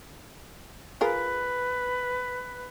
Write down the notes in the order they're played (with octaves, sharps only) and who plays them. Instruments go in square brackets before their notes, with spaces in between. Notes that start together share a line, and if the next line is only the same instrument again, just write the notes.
[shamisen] F4 G#4 A#4 [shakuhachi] B4